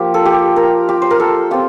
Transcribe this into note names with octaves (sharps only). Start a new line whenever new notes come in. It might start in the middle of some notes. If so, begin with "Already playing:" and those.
Already playing: F3 A#3 F4 G4
A4
G4
A#4
G4
C5
A#4
A4
C4 F4 G4